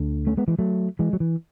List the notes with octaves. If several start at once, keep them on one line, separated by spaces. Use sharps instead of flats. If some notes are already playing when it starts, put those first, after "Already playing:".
Already playing: D2 D3
A3 C#4
G#3 B3
E3 G#3
F#3 A3
E3 G#3
F#3
E3